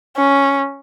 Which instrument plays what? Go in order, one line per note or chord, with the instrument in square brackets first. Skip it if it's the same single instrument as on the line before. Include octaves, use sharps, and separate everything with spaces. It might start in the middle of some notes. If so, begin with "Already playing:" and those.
[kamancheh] C#4